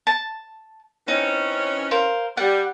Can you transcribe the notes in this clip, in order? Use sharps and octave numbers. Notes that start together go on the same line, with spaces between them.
A5
E3 C4 C#4 D#4
A#4 C5 F5
G3 F#5